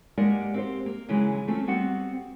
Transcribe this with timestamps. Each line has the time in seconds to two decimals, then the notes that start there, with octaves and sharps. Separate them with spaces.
0.18 G#3 A#3 G4 A#4 D5 F#5
0.54 C4 G4 C5
0.86 A#3
1.09 C#3 E3 F#3 G#3
1.48 A3 C4 C#4 F4
1.67 G3 B3 C4 F#4 F#5